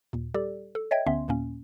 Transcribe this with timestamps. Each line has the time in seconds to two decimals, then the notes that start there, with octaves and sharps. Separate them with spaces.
0.13 D#2 A#2
0.34 G3 G4 A4 D5
0.75 A4
0.91 C#5 D#5 E5 G5 G#6
1.07 D2 D3 B3 C#4 E5 C6
1.28 D#2 A#2 A#3 C#4